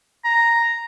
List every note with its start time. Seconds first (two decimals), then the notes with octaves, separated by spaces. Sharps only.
0.25 A#5